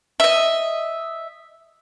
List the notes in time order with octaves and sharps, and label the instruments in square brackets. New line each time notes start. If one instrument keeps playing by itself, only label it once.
[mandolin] D#5 E5